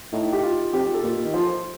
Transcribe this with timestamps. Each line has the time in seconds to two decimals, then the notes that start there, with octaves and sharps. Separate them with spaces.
0.13 A2 D#4
0.32 G4
0.43 F4
0.73 F2 G4
0.93 A4
1.03 A#2
1.24 D#3
1.34 F3 C5